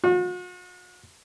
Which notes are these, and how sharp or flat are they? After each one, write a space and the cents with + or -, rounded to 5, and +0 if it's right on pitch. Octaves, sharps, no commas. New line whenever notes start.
F#4 -45